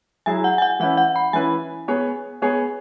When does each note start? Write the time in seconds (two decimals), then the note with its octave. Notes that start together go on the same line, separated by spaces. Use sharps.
0.26 F#3 E4 G#4 G#5
0.44 F#5
0.58 G#5
0.62 F#5
0.80 E3 C#4 E4 B4 F#5
0.97 F#5
1.16 B5
1.33 E3 C#4 E4 B4 G#5
1.88 B3 G#4 C#5
2.42 B3 G#4 C#5